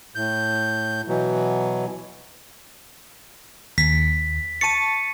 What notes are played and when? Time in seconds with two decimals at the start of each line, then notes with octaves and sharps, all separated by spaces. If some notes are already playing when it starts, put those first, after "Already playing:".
0.15 A2 G6
1.08 B2 E3 F#3
3.78 D#2 B6
4.61 A5 C#6 A6 C#7 D#7